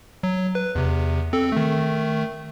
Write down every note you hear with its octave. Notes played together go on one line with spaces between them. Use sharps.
F#3
B4
E2 C3
C4 A4
D#3 A3